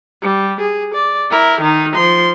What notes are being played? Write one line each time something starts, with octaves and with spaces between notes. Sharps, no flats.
G3
G#4
D5
E4 A#4
D#3 D#4
F3 C6